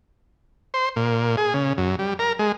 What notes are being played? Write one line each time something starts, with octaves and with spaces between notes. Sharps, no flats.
C5
A#2
G#4
C#3
F#2
G3
A#4
G#3